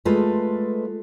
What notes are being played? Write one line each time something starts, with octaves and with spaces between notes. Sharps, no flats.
G#3 A3 F4 A4 B4